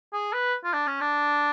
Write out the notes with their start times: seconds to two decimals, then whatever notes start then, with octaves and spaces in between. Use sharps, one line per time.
0.13 G#4
0.33 B4
0.64 F4
0.74 D4
0.87 C#4
1.01 D4